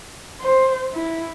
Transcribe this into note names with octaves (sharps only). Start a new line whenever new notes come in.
C5
E4